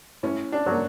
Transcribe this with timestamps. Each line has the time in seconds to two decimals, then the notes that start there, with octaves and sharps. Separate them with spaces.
0.23 A2 C#4
0.52 D4
0.66 F#3 A#3